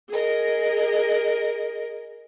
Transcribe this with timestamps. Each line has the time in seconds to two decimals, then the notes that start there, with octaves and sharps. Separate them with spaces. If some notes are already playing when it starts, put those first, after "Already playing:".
0.10 G#4 A#4 D#5